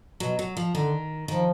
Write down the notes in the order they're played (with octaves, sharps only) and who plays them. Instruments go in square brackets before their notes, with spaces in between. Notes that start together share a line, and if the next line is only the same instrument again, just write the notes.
[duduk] B2 [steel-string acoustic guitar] F#3
[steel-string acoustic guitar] F#3
F3
[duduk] D3 [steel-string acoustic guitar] D#3
[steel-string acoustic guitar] D#3 [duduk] F3